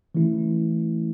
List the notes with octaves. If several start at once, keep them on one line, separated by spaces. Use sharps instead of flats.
E3 A3 C#4 E4